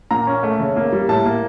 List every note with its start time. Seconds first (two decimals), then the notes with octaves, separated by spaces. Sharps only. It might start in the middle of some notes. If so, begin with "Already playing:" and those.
0.11 A#2 A#5
0.27 C#4
0.43 A3
0.60 C#3
0.76 A#3
0.93 G3
1.09 A2 A5
1.26 A#3